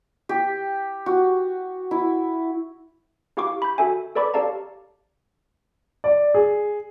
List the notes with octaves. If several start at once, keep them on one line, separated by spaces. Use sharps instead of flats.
G4
F#4
E4
E4 G4 F5 C#6 D6
B5 G6
F#4 A4 E5 G#5
A4 B4 D5 B5 C#6 D6
G4 A4 D5 F5 A5 A#5
D5
G#4